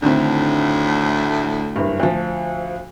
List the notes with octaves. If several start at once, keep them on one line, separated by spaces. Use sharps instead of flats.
D2 A2 D3 D#3 C4
F#1 G2
D2 F3